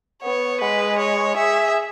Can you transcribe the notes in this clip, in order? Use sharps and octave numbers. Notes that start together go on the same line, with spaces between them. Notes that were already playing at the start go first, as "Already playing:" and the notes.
B3 C#5
G#3 B4
C#5
G#4 E5